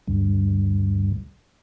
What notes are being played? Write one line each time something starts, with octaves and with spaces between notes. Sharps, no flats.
D2 G2